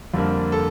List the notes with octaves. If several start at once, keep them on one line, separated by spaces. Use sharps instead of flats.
F2 D3 G3 A#3
A4